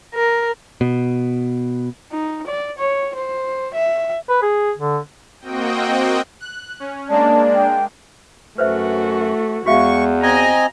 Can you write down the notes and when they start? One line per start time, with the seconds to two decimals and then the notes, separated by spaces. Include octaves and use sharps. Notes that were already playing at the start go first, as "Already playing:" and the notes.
0.14 A#4
0.81 B2
2.12 D#4
2.47 D5
2.78 C#5
3.15 C5
3.74 E5
4.29 B4
4.42 G#4
4.78 D3
5.40 A#3 C4 F#4 D#5 G5
6.40 F#6
6.80 C#4
7.09 G#3 A#3 D4 D5 A5
7.55 G5
8.58 F#2 A3 F#4 B4 C5 E5
9.66 E2 G#3 F#4 E5 F5 C#6
10.23 C4 D#5 G#5 A#5